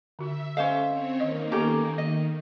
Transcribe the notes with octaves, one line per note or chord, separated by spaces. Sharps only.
D3 F#4 E5
C#4 A4 C5 D#5 F5
C4 C#5
D#3 A#3 D#5
B3 C#4 G4 A4 A#5
D#3 D#5